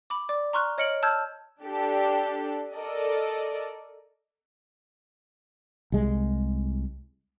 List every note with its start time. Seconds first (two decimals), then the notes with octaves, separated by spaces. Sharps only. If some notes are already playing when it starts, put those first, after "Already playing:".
0.10 B5 D6
0.29 D5 D6
0.53 A#5 C6 C#6 F6 F#6
0.78 C#5 D#5 F6 C#7 D7 F#7
1.03 A5 E6 F6 G6 G#6
1.63 D4 G4 A4
2.75 A4 A#4 D5 D#5
5.92 C2 G#3